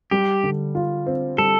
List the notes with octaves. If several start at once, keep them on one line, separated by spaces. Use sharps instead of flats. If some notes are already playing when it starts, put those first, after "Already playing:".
G3 G4
D3
F4
C4
G3 A4